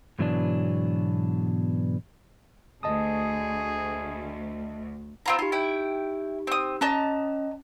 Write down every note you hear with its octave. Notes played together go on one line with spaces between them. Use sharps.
G#2 B2 E3 F#3 B3 D4
D2 G#4 D#5 A5 D#6
C4 F4 A#5 B5
D#4 F4 G4
E4 G5
C4 D#6
C#4 D#5 A5 A#5